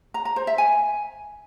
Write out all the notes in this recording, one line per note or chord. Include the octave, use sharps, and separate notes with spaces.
A#5
A#5
C5
E5
G#5